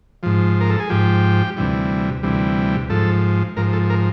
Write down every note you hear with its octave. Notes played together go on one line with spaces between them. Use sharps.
G#2 F3
A#4
A4
G#4
G#2 F3 G4
D2 C3 E3 G3
D2 C3 E3 G3
G#2 F3 A4
G#2 F3 A#4
A4
A#4